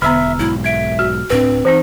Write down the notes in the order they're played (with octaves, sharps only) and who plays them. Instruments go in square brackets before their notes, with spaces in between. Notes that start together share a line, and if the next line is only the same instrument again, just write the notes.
[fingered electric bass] E1 [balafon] D3 B3 [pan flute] E5 [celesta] A#5 E6 F6
[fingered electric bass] B1 G#2 [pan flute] E4
[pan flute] E5 [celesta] G#6 D7
[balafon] F#4 [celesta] F6
[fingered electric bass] D1 A2 D4 [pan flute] C4 [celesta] B4
[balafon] E3 C4 D#4 [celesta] C5